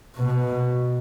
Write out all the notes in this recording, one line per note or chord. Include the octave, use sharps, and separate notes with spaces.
B2